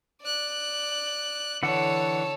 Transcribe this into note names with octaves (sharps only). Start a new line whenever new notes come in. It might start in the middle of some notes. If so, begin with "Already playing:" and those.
D5 F#6
D3 E3 A4 C#5 F#5